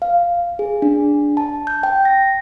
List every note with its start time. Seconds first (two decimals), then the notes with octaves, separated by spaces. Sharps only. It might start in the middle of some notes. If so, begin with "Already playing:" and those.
0.02 F5
0.59 G#4
0.82 D4
1.37 A5
1.67 G6
1.83 G5
2.05 A#6